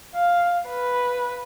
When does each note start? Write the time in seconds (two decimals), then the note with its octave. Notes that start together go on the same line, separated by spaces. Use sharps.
0.15 F5
0.69 B4